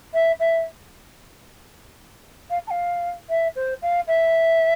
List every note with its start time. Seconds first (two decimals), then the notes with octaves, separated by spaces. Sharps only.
0.13 E5
0.39 E5
2.50 F5
2.67 A5
2.70 F5
3.29 E5
3.55 C5
3.82 F5
4.07 E5